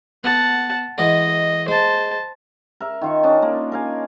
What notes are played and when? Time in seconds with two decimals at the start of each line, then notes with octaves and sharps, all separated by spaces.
0.24 B3 F#5 A5
0.98 E3 G#3 D#5 F#5
1.68 G#3 C5 A5
2.80 A#4 E5
3.02 D#3 F4 C#6
3.23 C#4 D4 D#5 A5
3.42 A#3
3.72 A#4 F5 G#5